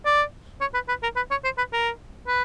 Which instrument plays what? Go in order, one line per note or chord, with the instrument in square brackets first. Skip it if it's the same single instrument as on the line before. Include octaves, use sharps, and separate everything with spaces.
[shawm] D5
C#5
B4
B4
A#4
B4
C#5
C5
B4
A#4
B4